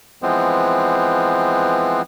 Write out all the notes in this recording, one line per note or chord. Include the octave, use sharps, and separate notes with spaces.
E3 F3 G#3 B3 C4